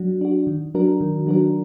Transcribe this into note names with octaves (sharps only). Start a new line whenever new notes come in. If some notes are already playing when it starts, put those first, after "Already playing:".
Already playing: F#3 D4 F#4
D4 F#4
D#3
F#3 D4 F#4 A#4
D#3
F#3 D4 F#4 A#4